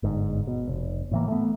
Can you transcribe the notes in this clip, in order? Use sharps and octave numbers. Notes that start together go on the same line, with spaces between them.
G1 G#2
B2
F1
A2 E3 A#3
A3 B3